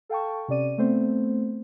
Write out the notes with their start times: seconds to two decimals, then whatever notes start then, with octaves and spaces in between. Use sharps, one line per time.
0.09 A4 F5 G5 A5 C#6
0.48 C3 C#4 D5 D#7
0.78 A3 B3 C4 C5